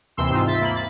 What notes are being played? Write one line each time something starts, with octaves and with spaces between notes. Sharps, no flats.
D#2 C3 E3 C4 C6 E6
G#2 C4 D#4 F4
E5 A6 B6
A#3 B5
A6